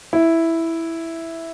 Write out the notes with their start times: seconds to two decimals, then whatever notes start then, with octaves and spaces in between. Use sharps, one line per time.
0.13 E4